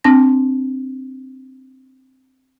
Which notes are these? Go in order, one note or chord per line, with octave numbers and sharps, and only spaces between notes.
C4 D4 A5 A#6